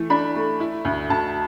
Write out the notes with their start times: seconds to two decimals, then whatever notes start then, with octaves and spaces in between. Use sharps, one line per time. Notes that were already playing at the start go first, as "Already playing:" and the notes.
Already playing: E3 A3
0.10 D4 B5
0.35 A3
0.60 E4
0.85 D2
1.10 D2 A5